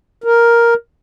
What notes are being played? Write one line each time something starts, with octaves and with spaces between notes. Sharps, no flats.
A#4